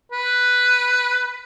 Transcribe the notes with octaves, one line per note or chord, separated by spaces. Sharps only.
B4